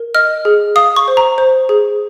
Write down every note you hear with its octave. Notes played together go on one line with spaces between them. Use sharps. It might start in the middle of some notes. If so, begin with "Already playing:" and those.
Already playing: A#4
D#5 F6
G#4
F5 D#6
C#6
C5
A#5
C5
G#4